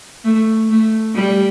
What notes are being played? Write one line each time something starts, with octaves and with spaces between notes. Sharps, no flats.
A3
A3
G3